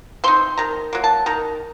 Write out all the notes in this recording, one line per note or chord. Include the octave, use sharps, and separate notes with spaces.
C4 D#4 C6
D#3 A#5
F#3 A#3
A5
D#3 A#5